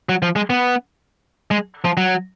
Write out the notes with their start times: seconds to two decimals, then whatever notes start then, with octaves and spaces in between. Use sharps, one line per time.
0.09 F#3
0.22 F3
0.36 G#3
0.50 B3
1.51 G#3
1.85 F3
1.97 F#3